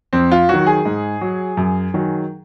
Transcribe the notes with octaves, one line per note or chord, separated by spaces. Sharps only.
F2 C4
F4
D#3 F#3 F#4
G#4
G#2
F#3
F#2
D#3 F#3